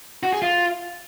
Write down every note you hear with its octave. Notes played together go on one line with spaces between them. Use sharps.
F#4
G#4
F4